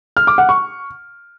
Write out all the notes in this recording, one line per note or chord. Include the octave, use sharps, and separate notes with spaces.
F6
D6
F#5
C#6